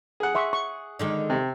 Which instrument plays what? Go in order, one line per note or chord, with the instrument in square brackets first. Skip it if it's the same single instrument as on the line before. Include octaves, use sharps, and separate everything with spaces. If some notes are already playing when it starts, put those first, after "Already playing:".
[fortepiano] G#4 F#5
[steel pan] E5 C6 C#6
C#6
[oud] D3 D#3 G#3
[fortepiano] C3